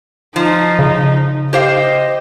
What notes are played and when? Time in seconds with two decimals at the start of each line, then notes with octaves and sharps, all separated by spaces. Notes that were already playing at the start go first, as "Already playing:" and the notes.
0.36 F3 D#4
0.79 C#3
1.53 G4 C5 D#5 F5